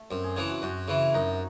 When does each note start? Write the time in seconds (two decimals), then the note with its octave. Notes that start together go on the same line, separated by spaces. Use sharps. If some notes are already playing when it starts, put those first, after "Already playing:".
Already playing: A3
0.10 F#2 C4
0.24 G#4
0.36 C#3 E3 G#4
0.49 F#4
0.62 F#2 F#4
0.88 C#3 E3 E4
1.14 F#2 D#4